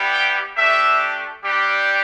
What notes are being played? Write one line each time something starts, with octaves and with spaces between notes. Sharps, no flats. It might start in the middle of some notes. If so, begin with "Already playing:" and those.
Already playing: G3 B3 E4 G4
G5
A3 D4 G4 E5
G3 D4 G4